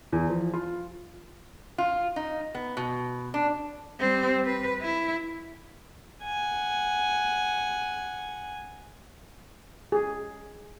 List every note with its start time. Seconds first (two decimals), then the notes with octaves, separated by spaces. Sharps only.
0.12 E2
0.30 F3
0.53 F4
1.78 F4
2.16 D#4
2.55 B3
2.77 B2
3.34 D4
4.00 G3 C4
4.45 B4
4.81 E4
6.23 F#5 G#5
9.92 G#4